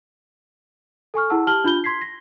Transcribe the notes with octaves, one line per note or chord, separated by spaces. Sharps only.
A4 G#5 C#6 F6
E4 G#4 F#5 A5 E6
G4 A5 F6 F#7 G7
D4 F4 B5 G6 G7
C6 G#6 B6 C7
A#6